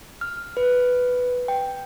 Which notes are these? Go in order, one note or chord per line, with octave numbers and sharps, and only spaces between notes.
F6
B4
G5